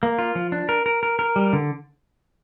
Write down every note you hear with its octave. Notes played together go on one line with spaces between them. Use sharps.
A#3
F4
F3
D4
A#4
A#4
A#4
A#4
G3
D3